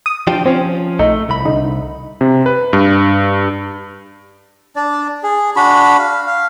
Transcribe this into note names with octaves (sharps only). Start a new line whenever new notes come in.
D#6
F3 D4 G4
F3 C4 C#4
A#1 A3 D#4
C2 B5
D3 D#4
C3
B4
G2
D4 D5
G#4
D4 F#4 B5
F5
F5